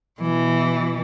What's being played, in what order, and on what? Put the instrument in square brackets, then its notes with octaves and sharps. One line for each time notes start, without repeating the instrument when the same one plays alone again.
[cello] B2 E3